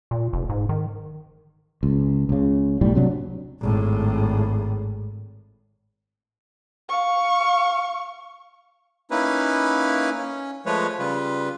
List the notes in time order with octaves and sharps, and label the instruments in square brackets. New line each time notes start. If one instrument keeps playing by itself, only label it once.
[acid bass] A#2
F1
G#2
D#3
[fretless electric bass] C#2
C#2 C#3
B1 A2 G3
C3 F#3 D4
[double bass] G#1 A2
[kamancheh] F5 C#6
[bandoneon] A#3 C#4 D#4 E4 B4
C#4
F3 G#3 A3 B4 C#5
C#3 G3 F4 B4